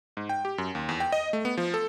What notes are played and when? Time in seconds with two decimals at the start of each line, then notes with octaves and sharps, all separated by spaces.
0.17 G#2
0.29 G5
0.45 G4
0.58 F#2
0.75 D#2
0.89 E2
1.00 G5
1.12 D#5
1.33 A3
1.45 B3
1.57 F3
1.74 A4